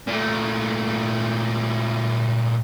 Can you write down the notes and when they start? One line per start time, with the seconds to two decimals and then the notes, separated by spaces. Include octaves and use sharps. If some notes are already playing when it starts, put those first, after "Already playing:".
0.07 A#2 A3